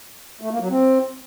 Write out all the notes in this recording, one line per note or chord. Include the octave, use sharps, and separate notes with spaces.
A3
A#3
F#3
C4